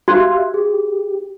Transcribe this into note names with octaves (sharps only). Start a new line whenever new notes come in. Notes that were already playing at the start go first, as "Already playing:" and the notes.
F#4 G4 E5 F5 C6 F#6 G#6
G4 G#4